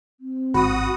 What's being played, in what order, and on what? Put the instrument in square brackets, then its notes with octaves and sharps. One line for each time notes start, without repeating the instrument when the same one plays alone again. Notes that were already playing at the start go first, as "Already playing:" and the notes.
[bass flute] C4
[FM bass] G#1 [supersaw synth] F#4 D#6 [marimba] B5